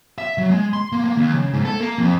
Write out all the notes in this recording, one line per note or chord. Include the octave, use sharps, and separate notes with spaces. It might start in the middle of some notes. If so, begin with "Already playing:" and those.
E5
F#3
G#3
C6
A#3
A#3
D#2
C#3
G#2
A4
A#3
F2